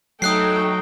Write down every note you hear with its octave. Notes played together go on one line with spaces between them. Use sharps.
F#3 A3 D#4 A4 G5 D#6 F#6 C7